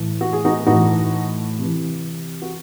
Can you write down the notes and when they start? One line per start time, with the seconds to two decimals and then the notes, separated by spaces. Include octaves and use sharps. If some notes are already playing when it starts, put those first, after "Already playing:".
Already playing: A2 E3
0.21 F#4
0.33 G#4
0.45 D#4 F#4
0.67 A2 E3 D#4 F#4
1.59 C3 E3
2.42 F#4